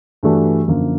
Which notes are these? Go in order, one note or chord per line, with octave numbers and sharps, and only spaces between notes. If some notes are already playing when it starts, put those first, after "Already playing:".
G2 E3 A3 D4 F#4
F#2 D3 F3 A#3